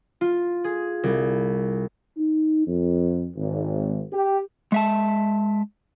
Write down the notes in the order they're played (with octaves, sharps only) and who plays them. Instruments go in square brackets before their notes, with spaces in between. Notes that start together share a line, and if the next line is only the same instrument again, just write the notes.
[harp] F4
G#4
C2
[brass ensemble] D#4
F2
G#1
G4
[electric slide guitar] G#3 E5 A5